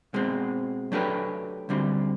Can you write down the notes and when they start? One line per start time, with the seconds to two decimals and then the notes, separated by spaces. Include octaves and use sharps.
0.14 B2 G#3 C4
0.92 F#3 A3 D4 G4 B4
1.69 D2 D3 G3 C4